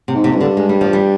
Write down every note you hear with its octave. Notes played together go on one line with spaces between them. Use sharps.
C3
G#2
C3
F2
G2
D3
G#3
G3
F3
G3